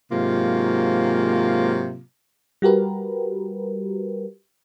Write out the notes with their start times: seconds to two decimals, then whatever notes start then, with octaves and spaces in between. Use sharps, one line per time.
0.12 G#2 C3 F#3 A#3 F4
2.62 G3 F#4 G4 A#4 B4